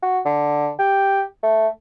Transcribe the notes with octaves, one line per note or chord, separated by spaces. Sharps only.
F#4
D3
G4
A3